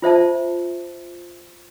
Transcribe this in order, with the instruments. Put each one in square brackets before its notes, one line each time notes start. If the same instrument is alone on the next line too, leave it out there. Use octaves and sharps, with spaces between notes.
[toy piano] F4 C5 E5 A5